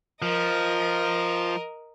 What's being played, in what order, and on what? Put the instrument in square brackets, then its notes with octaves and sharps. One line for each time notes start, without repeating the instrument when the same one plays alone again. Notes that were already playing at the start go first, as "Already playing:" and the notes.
[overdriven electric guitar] F3 [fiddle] A#4 D#5